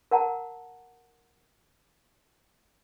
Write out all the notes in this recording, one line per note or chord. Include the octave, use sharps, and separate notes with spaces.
A#4 F#5 A5 A#5